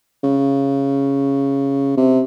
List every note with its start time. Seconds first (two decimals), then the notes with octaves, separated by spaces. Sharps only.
0.23 C#3
1.97 C3